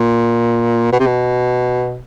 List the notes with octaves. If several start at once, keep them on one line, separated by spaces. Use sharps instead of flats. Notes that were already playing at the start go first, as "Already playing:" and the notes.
Already playing: A#2
B2
C3
B2